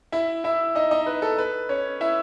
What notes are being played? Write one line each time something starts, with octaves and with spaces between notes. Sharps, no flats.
E4 E5
E4 E5
D#4 D#5
D#4 D#5
B4
A4
B4
C#4 C#5
E4 E5